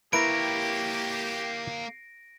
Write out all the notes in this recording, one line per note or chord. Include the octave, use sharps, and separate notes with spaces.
A#3 E4 G4 A#4 B4 C#5 A#6 D7